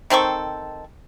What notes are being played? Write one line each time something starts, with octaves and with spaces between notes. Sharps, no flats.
D#3 C4 A4 C#6